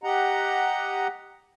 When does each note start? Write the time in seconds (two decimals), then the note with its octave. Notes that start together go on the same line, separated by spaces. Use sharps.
0.04 G4 D#5 F#5 A#5